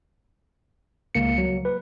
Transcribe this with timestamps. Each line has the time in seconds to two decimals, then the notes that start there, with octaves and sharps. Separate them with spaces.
1.15 C#2 A#3 C#7
1.38 F#3
1.65 B4